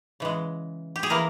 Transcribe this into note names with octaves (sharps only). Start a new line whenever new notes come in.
C#3 E3 G#3
G4
G#4
E3 A#3 E4 A#4